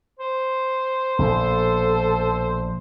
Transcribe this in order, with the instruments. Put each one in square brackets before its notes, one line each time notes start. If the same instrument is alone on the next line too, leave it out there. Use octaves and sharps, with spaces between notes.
[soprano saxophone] C5
[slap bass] A#1 B2 [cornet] A4